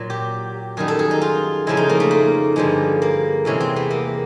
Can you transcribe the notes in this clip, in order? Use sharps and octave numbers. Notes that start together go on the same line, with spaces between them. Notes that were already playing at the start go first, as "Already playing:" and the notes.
Already playing: A#2 F#3
G4
F#2 D#3 G3 G#4
A4
G#4
D#4
F4
F2 C#3 F3 G#3 E4
D#4
A#3
A3
A#3
G2 D3 F3 G#3
A#3
E2 C3 E3 G#3 C#4
C4
B3
A#3